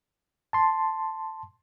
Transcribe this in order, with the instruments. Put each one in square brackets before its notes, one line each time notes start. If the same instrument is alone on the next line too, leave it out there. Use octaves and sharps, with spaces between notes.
[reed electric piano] A5 C6